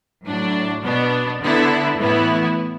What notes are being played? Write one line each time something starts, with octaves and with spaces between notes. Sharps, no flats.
A2 F#3 D4
B2 B3 D4
D3 B3 E4
A2 E3 B3 E4